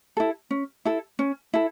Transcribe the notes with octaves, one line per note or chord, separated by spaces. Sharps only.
E4 A4
C#4
E4 A4
C#4
E4 A4